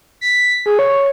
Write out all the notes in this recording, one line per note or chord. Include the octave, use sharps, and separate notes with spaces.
B6
G#4
C#5